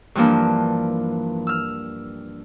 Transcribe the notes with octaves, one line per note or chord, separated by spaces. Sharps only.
G2 E3 F3 A#3 D4
E6 F6